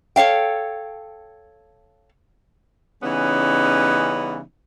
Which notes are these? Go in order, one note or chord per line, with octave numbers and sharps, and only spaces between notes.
A4 C#5 F5 G5
C#3 E3 G3 B3 C#4 D#4